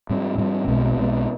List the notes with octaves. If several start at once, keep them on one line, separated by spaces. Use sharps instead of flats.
G#2 G3 C4
G#2 G3 C4
B1 B2 G#3 C4
B1 B2 G#3 C4